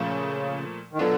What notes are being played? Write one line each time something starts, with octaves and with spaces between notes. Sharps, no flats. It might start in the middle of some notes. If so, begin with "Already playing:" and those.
Already playing: A#2 C#3 F3 A3
D#3
B2 D3 F#3 B3 D4 F4